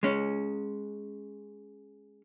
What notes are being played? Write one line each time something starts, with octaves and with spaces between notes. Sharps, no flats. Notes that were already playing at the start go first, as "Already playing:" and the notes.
G#3 C#4